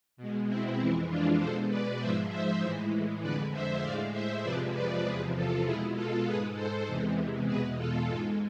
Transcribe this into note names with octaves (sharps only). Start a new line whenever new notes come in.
B2 G#3
C4 E4
F2 E3 G#3 C4 E4
D4 F4
B2 G#3 A4 C5
B4 D5
G#2 F3 G#3 C5 E5
C5 E5
A2 E3 G#3
F2 D3 G#3 B4 D5
C5 E5
A2 G#3 D5 F5
C5 E5
F2 C3 F3 G#3 B4 D5
B4 D5
E2 C3 F3 G#4 B4
F4 A4
B2 G#3 E4 G#4
F4 A4
G#2 G#3 G#4 B4
A4 C5
E2 C3 E3 G#3
E2 B2 G#3 G#4 B4
F4 A4
G#2 G#3 F4 A4